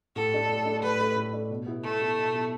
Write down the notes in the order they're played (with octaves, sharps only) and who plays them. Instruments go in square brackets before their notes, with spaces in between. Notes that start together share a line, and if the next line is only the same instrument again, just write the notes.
[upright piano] A2 [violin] A4
[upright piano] A3 D4
A2
A3 D4
[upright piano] A2 [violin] B4
[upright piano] A3 D4
A2
A3 D4
B2
B3 E4
[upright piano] B2 [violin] A3
[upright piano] B3 E4
B2
B3 E4